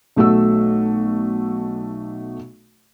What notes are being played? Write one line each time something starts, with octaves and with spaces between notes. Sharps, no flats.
B1 A3 F#4 E6